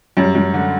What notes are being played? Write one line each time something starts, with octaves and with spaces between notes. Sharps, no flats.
F#2 G3
F#2
D3